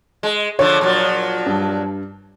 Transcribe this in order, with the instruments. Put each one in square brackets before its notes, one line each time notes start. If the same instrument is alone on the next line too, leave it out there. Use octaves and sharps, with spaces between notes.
[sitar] G#3
[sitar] D3 F3 [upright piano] C#5
[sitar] A#2 F3 F#3
[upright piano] G2